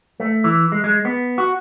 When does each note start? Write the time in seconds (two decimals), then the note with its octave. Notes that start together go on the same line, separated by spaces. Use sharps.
0.20 A3
0.44 E3
0.72 G#3
0.84 G#3
1.05 B3
1.38 F#4